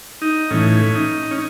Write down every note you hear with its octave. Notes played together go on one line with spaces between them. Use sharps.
D#4
A2 E3 C#4
D#4
C#4